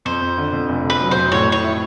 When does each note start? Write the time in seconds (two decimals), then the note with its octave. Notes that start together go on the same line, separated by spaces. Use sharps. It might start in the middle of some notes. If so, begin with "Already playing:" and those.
0.05 F2 C5
0.21 F2
0.38 D3
0.53 F2
0.69 F1
0.84 F2
0.90 B4
1.01 F#3
1.11 C5
1.16 F2
1.32 A2 C#5
1.48 A2 C#5
1.63 E4